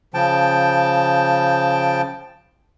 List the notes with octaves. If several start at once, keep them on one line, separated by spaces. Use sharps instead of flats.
C#3 F3 G5 A5